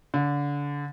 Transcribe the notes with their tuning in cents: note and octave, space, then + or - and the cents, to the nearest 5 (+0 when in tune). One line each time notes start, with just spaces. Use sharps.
D3 -30